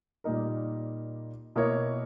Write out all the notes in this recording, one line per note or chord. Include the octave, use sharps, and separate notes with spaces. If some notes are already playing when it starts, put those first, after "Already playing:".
A#2 G3 A#3 D#4 A#4
B2 A#3 E4 A#4 C#5